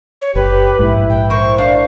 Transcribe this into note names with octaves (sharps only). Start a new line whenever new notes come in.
C#5
F#1 G4 B4
A#1 G#2 E4
G5
A#4 C5 C#6
D4 F5